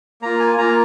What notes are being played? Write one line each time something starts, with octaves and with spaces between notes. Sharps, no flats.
A#3 F4 A#5
G#5
A#3 F4 A#5